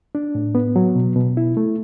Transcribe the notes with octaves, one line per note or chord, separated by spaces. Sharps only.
D4
A2
B3
F#3
B2
B2
E4
A3